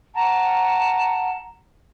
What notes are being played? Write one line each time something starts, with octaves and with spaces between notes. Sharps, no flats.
F#5 A5 A#5